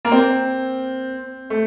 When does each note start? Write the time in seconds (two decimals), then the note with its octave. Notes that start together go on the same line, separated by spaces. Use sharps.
0.05 A#3
0.12 C4
1.50 A3